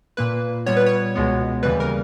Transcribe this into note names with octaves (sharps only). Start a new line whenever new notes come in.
A#2 A#3 B4
A#2 G3 B3 C#5
B4
C#5
C#2 B2 G#3 B3
D#2 C#3 E3 G3 B4
A#4